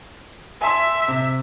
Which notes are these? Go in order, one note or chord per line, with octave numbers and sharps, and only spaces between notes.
E5 G#5 A5 C6
C3